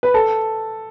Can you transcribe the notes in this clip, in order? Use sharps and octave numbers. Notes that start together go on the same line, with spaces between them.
B4
A4